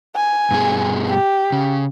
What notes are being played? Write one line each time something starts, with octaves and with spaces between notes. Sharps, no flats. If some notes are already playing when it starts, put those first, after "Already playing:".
G#5
G2 B2 G#4
G4
C#3